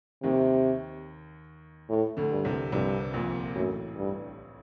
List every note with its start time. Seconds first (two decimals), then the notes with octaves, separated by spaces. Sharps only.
0.23 D#2 C3 D#3
1.89 A2
2.17 D2 D3
2.31 G2
2.45 C2 C3
2.72 C2 G2 C3
3.14 A#1 A#2
3.55 A1 F#2 A2
3.97 G2